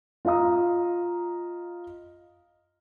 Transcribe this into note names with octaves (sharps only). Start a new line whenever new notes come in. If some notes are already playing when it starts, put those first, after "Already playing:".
F4 D#5 F5 A#5 D#6